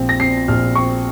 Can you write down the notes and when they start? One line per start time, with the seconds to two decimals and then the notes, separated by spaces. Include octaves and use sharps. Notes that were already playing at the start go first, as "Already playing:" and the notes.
Already playing: A#1 F3 C4
0.09 A#6
0.20 C4 C7
0.48 A#1 F6
0.75 C4 C#6